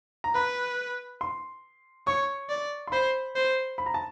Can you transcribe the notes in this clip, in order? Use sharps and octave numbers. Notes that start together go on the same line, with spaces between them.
A#5
B4 B5
C6
C#5 C#6
D5
C6
C5 B5
C5
B5
A#5
A5